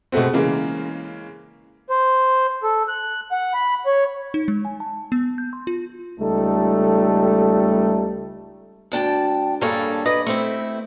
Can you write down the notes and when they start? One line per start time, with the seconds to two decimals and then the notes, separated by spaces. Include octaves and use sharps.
0.12 B2 G#3 A3 B3 C4
0.33 C#3 E3 G#3 A#3
1.90 C5
2.63 A4
2.88 F#6
3.32 F#5
3.54 B5
3.86 C#5
4.34 D#4
4.48 G#3
4.65 G#5
4.80 A5
5.12 B3
5.38 G6
5.53 C6
5.67 F4
6.20 C#2 G3 A3 D#4 A4
8.92 D2 D4 G5 A5
9.61 G2 G3 A#3 G#4 A4 C#5
10.06 B4 D5 D#5
10.27 A3 C4 E4